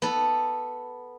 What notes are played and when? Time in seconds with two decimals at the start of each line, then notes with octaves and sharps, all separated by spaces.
0.02 B3 A4